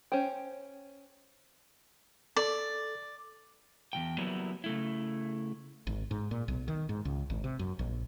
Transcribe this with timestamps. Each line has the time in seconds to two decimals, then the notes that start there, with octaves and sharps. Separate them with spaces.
0.12 C#4 C5 G5
2.36 A4 D5
3.93 E2 E3 G5
4.18 F#3 G3 A#3 B3 E4 C#5
4.64 C#3 A3 E4
5.87 G#1
6.11 G#2
6.31 A#2
6.48 B1
6.68 D#3
6.89 G#2
7.05 C#2
7.30 G#1
7.44 C3
7.59 F#2
7.79 A#1